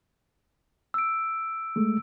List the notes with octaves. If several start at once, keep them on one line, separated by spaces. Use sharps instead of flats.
E6 D7
G#3 A3